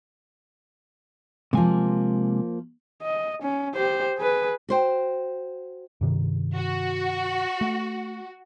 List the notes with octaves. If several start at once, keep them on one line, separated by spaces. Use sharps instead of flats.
C3 F3 G#3 A#3 G#5
D#5
C#4
G4 C5
G#4 B4
F#4 C5 G5
G2 C3 D#3
F#4
A3